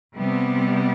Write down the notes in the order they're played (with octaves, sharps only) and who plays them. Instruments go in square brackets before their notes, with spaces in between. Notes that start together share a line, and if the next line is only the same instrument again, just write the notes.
[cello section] C3 G3 B3